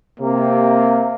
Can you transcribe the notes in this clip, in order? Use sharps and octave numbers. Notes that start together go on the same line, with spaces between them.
C3 A#3